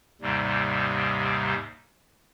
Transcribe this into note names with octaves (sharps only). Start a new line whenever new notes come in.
D#2 G#2 C3 G3